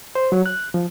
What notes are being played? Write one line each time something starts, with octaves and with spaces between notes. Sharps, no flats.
C5
F#3
F#6
F3